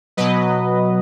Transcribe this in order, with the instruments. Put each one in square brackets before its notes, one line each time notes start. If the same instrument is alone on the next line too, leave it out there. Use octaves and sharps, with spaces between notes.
[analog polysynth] B2 F#3 B4 D#5